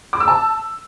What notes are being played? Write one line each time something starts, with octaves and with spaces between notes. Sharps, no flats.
D6
E6
A5